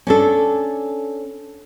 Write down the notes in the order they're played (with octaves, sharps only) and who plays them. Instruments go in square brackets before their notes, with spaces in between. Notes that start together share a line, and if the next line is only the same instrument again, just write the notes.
[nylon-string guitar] C#4 D4 A4